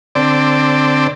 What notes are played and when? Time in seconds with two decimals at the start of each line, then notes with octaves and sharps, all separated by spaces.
0.15 D3 C4 D5